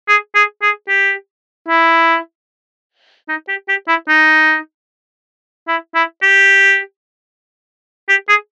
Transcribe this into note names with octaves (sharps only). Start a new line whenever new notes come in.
G#4
G#4
G#4
G4
E4
D#4
G4
G4
E4
D#4
E4
E4
G4
G4
G#4